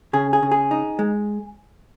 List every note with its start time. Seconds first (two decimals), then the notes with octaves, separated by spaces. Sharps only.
0.13 C#3 G#4
0.33 G#4
0.43 C#3
0.52 G#4
0.71 D#4
0.99 G#3